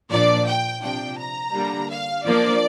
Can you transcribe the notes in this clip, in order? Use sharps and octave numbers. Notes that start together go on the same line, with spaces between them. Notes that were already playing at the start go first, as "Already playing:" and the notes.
A#2 F3 D4 D5
G5
C3 F3 D4 G5
A#5
D3 G3 A#3 D4
F5
F3 A#3 D4 D5